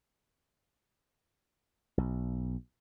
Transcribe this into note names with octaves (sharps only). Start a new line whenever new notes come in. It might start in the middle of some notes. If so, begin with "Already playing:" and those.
B1